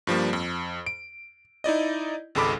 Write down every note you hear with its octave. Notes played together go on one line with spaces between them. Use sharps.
G2 F3 G3 A#3
F2
D7
D#4 E4 D5 D#5
G#1 C#2 G#3 A4 B5 D6